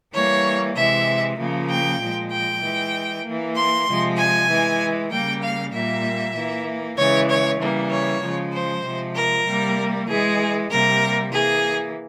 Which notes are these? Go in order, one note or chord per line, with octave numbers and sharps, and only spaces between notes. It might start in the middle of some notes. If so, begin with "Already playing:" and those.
E3 G3 A#3 C#5
C3 E3 G#3 E5
C#3 F3 A#3
G5
A#2 F3 G#3
G5
E3 G#3
E3 A#3
C6
C3 F3 G#3
G#5
E3 G#3
C#3 G3 A#3 G5
F5
A#2 G3 A#3 E5
E3 A#3
C#3 E3 G#3 C#5
C#5
C#3 E3 G3 A#3
C#5
C#3 F3 G#3
C5
C3 F3 G#3
A#4
C3 G3 A#3
E3 G#3 G#4
C3 G3 A#3 A#4
E3 A#3 G#4